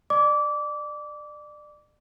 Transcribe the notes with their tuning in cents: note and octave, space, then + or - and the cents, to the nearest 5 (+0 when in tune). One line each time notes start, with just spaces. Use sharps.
D5 +30 D6 -25